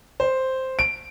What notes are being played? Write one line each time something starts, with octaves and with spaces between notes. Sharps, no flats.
C5
D7